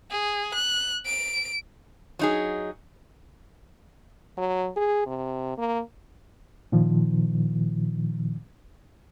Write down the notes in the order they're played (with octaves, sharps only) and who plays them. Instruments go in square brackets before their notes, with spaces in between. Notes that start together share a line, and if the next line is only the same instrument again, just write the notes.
[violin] G#4
F#6
D7
[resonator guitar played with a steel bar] F#3 D#4 G#4
[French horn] F#3
G#4
C3
A#3
[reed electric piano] A#2 D#3 F3